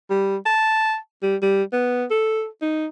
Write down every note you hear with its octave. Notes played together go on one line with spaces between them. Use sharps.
G3
A5
G3
G3
B3
A4
D#4